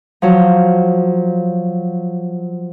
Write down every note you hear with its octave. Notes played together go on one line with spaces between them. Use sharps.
F3 F#3